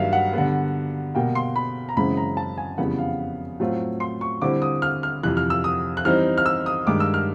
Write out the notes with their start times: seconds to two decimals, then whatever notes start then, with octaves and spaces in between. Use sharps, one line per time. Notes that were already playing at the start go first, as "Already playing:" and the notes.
Already playing: G2 D#3 F#3 A#3 E5 F5
0.13 F#5
0.33 D3 G3 B3
1.15 B2 G3 A#3 G5
1.35 C6
1.56 B5
1.89 A#5
1.97 F#2 C#3 E3 G#3 C4 B5
2.17 A#5
2.37 A5
2.58 G#5
2.78 F2 C#3 E3 G3 B3 F#5
2.98 F5
3.60 A2 F#3 A3 C4 F4
4.00 C6
4.21 C#6
4.42 D3 G3 C4 E4 D6
4.62 D#6
4.82 F6
5.03 F6
5.23 F2 C3 E3 F#6
5.37 F6
5.50 E6
5.64 D#6
5.97 F#6
6.05 E3 G3 C4 D#4 F6
6.38 F6
6.46 E6
6.66 D#6
6.87 G2 D#3 G#3 D6
7.00 E6
7.14 F6